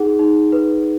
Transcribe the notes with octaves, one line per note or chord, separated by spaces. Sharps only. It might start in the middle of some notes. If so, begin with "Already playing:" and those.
Already playing: D#4 G#4 F#5
D#4
B4